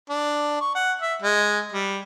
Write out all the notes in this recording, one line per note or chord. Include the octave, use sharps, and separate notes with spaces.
D4
C#6
F#5
E5
G#3
G3